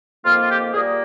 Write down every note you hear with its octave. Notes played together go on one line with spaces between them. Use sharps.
F2 D#3 A#3 F4
F4
G4
A#2 G3 A#3 G#4